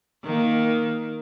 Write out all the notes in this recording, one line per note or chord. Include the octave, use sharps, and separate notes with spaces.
D#3 A#3